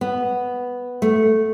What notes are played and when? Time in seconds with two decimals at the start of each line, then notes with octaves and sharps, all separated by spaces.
0.01 B3
1.02 A3